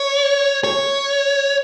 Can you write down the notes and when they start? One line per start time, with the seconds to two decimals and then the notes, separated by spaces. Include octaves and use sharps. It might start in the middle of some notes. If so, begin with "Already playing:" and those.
Already playing: C#5
0.64 C#5